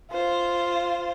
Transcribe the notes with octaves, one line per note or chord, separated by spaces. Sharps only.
F4 C5